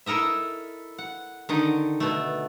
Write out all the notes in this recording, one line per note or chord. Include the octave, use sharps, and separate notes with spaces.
E4 A4 A#4 D#5 E5
F#5
D3 D#3 D#5
B2 A3